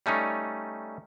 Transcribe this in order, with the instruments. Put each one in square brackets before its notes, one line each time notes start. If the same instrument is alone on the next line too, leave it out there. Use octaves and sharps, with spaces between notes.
[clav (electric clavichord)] G3 A3 C#4 D#4